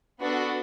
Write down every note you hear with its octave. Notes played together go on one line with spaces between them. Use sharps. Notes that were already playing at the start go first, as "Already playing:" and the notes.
B3 D4 F#4 A4